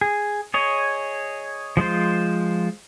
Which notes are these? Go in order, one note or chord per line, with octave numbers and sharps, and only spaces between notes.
G#4
G#4 C#5 D#5
F3 G#3 F4 C5